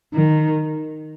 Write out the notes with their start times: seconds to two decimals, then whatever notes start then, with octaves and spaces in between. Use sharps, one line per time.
0.14 D#3